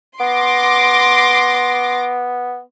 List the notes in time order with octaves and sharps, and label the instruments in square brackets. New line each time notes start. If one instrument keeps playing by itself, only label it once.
[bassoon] B3 [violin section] C6 D6 A#6